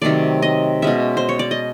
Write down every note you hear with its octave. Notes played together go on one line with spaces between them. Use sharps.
C3 D#3 F#3 A3 D5
D#5
B2 G#3 C#4 E5
C5
C#5
D5
D#5